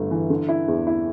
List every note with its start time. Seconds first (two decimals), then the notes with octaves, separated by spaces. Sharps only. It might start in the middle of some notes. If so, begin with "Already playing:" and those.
Already playing: G1 A3
0.11 E3
0.30 D3
0.49 E4
0.68 E2
0.87 E4